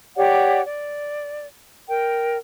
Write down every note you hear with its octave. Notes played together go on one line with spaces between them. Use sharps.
G4 C#5 D5 F#5
D5
A#4 G5